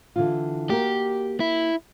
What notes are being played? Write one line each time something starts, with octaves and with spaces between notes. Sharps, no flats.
D3 E3 F4
A#3 F#4 G4 A#4
E4